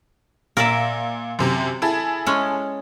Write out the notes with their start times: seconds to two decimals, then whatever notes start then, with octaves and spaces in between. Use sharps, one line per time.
0.57 A#2 A#4 D5 E5
1.39 F#2 C3
1.82 E4 G#4 A4
2.26 G#3 C#4